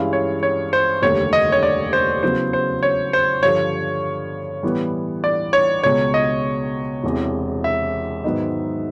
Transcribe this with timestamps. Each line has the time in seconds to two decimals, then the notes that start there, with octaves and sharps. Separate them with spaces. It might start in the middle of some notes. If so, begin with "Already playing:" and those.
Already playing: G2 E3 G#3 C#4 E4 F5
0.13 C#5
0.43 C#5
0.73 C5
1.02 F1 D#2 D3 G3 A#3 C#5
1.33 D#5
1.52 C#5
1.63 D5
1.93 C5
2.22 E2 C#3 F#3 B3 C5
2.53 C5
2.83 C#5
3.13 C5
3.43 G2 D3 F3 C#5
4.63 A2 E3 G3 B3 E4
5.24 D5
5.53 C#5
5.83 C#2 B2 G#3 C#5
6.14 D#5
7.04 E1 E2 C3
7.64 E5
8.24 G#2 D#3 F#3 B3 D#4